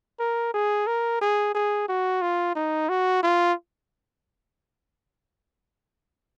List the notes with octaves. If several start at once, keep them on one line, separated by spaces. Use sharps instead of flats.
A#4
G#4
A#4
G#4
G#4
F#4
F4
D#4
F#4
F4